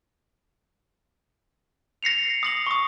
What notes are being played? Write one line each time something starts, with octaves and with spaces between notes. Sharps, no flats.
A#6 C7 C#7 F7
D#6 A#6 F#7
C#6 D#6